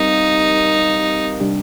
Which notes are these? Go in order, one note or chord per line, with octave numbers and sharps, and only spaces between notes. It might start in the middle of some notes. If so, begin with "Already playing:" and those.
Already playing: G3 C4 D#4 G4 A#4 F5
C3 G3 D4 G4